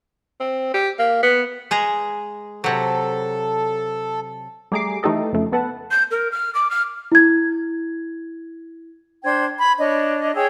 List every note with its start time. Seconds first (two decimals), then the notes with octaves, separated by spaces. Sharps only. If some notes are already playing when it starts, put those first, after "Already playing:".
0.40 C4
0.74 G4
0.99 A#3
1.23 B3
1.71 G#3 G#4 A#5
2.64 C3 F#3 A4
4.72 G3 A3 G#4 A#5 D6 C7
5.03 E3 A3 D#4 G4 A4 D#5
5.33 F2 C#3 A3
5.52 B3 A4 B4 F#5 A5
5.91 G6
6.11 A#4
6.32 F6
6.55 D6
6.71 F6
7.12 E4 G#6
9.24 D4 C5 G5 G#6
9.58 B5 G#6
9.78 D4 C#5 D#5
10.35 G#4 C#5 G5 E6